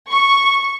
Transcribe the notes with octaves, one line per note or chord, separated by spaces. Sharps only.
C#6